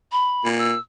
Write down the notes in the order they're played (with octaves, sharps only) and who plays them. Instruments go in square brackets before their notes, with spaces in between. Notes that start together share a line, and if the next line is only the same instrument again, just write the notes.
[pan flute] B5
[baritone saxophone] A#2
[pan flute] E6